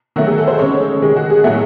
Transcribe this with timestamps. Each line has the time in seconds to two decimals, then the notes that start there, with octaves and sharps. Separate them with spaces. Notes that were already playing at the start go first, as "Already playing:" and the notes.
0.16 D#3 F#3 A3 F#4
0.27 G#4
0.38 A4
0.48 C5
0.59 C#3 G#3 C#5
0.81 A4
1.02 D#3 G#3 G#4
1.16 F#4
1.30 G#4
1.44 A2 F#3 A3 F#4